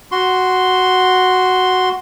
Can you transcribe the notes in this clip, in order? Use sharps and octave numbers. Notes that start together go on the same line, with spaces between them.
F#4 C6